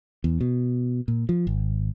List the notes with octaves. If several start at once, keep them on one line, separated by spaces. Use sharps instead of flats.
E2
B2
A#2
F3
G#1